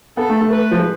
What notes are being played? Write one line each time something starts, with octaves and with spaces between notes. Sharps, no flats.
B3 A4
A3
A3
B4
F3
G#3